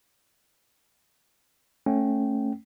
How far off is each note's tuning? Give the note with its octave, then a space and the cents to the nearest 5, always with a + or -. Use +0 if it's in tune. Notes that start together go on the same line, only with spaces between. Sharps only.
A3 +10 C#4 -15 G5 -25